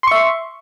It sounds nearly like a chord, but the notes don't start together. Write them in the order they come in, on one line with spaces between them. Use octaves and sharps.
C6 C#6 E5